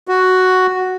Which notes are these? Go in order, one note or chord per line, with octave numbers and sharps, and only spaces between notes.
F#4